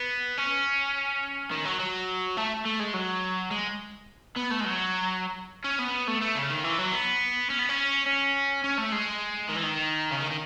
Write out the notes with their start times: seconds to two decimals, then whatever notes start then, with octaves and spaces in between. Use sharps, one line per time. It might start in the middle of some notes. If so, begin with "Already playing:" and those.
Already playing: B3
0.37 C#4
1.52 D#3
1.65 F#3
1.80 F#3
2.37 A3
2.65 A3
2.80 G#3
2.93 F#3
3.51 G#3
4.36 B3
4.50 A3
4.60 G#3
4.65 F#3
5.64 C#4
5.79 B3
6.07 A3
6.21 A3
6.36 C#3
6.50 D#3
6.64 E3
6.79 F#3
6.93 B3
7.50 C#4
7.59 B3
7.69 C#4
8.06 C#4
8.64 C#4
8.78 A3
8.92 G#3
9.49 D#3
9.56 E3
9.63 D#3
10.11 C#3
10.20 D#3
10.31 D#3